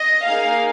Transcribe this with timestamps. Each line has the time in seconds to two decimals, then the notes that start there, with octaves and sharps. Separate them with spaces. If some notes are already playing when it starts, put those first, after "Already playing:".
Already playing: D#5
0.25 A#3 D#4 G#4 F5